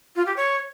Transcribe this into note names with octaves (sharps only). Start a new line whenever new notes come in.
F4
G4
C#5